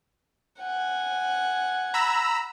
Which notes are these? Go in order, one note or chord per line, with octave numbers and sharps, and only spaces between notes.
F#5 G#5
A#5 B5 E6